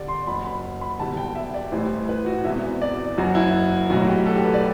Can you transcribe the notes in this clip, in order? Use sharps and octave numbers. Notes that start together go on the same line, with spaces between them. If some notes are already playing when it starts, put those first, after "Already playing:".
Already playing: E2 D3 G3 D5
C6
F#1 F#2 F#3 B5
B5
B5
E1 E2 D3 G3 A5
G5
E5
D5
A1 A2 E3 G3 C5
B4
F#4
E1 E2 C3 E3 E5
D5
F#1 F#2 F#3 F#4
E4
B1 A2 F#3 F#4
G4
A4
G4
B4
D5